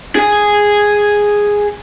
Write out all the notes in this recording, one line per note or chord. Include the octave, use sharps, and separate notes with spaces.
G#4 G#5